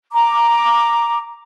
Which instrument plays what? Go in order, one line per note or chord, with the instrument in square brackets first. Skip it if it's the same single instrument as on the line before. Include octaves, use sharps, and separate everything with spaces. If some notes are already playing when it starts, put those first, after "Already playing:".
[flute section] A#5 D6